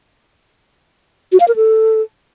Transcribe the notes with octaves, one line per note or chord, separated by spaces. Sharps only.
F#4
F5
A#4
A4